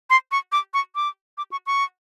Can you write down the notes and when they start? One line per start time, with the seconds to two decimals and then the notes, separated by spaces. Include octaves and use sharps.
0.10 C6
0.31 C#6
0.52 D6
0.74 C#6
0.95 D6
1.38 D6
1.51 C#6
1.66 C#6